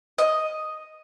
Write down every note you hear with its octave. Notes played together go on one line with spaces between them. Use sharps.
D#5